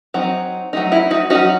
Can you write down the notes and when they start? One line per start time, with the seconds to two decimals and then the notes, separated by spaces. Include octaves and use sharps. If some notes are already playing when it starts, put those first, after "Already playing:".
0.14 F#3 C4 D#4
0.73 F#3 A3 D#4
0.92 E4
1.11 D#4 F#4
1.30 F#3 C#4 D#4 F#4